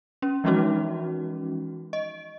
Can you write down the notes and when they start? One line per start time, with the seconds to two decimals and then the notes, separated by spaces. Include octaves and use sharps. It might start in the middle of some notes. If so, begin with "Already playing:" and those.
0.22 C#4
0.44 E3 F3 G#3 C#4 D#4 F#4
1.93 D#5